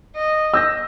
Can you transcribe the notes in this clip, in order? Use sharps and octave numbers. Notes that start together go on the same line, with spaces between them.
D#5
E6 G6 A#6